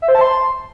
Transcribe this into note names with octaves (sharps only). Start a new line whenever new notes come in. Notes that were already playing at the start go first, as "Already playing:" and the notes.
E5
C5
A5
C6